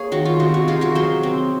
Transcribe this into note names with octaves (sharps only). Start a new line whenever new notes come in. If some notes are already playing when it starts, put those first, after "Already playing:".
Already playing: A#3 G#4 C#5
D#3 F#4
F4
C3 F#4
F#4
D#4 F4 G#4
F#4 A#4
F#3 G#4 C5
C4